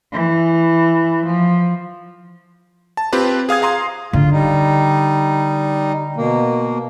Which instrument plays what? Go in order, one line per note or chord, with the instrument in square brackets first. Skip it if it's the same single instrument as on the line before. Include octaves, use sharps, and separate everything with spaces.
[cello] E3
F3
[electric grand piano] A5
C4 F4 G4 B4
G#4 F5 D#6 G#6
F5 A#5 C6 D#6
[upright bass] D3 [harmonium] F4
[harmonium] G3 D#4
B2 A#3